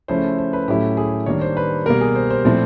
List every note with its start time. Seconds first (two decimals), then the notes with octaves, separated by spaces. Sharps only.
0.08 C#3 F3 A3 C#4 E4 C5
0.38 C5
0.53 B4
0.68 A2 F#3 A3 C#4 E4 G4
0.97 G#4
1.26 D#3 G3 A#3 D4 C#5
1.41 C5
1.57 B4
1.86 B2 G3 A#3 A#4
2.01 G#4
2.15 C5
2.31 C5
2.45 A#2 F3 A3 C4 E4